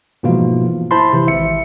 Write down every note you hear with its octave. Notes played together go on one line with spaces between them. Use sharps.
G#2 B2 E3 F3 A#3 F4
E4 C5 A5 B5 C6
C3 E3
G#1 E5 C#7